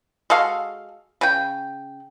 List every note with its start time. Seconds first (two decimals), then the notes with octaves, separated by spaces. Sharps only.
0.30 G#3 F#4 A4 F5
1.21 C#3 G5